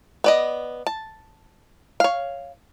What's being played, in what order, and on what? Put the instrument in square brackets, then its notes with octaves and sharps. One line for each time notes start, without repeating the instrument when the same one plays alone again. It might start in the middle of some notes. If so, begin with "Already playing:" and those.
[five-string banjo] B3 D5 D#5
A5
C#5 F5